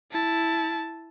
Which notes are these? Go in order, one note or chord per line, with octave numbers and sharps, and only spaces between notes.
E4 A5